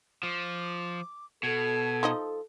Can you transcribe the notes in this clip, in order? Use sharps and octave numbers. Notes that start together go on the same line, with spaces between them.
F3 D6
B2 A4 G#6
F3 D#4 D#5